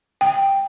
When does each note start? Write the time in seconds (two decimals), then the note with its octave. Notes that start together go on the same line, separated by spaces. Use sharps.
0.21 G5